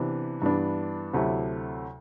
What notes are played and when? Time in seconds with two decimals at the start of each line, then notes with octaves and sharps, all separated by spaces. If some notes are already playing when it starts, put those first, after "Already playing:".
Already playing: C3 E3 B3 D4
0.42 G2 E3 B3 D4
1.13 D2 C3 F#3 A3 E4